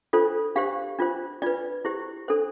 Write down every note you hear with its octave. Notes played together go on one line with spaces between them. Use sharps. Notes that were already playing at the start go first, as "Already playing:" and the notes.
D4 F4 A4 C5
D4 G4 C5 F5
D4 F4 C5
D4 F4 B4 D5
E4 G4 C5
D4 A4 C5